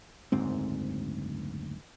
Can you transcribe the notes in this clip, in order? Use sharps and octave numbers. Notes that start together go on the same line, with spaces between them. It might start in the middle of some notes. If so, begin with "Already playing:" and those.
F#1 D2 G#2 C4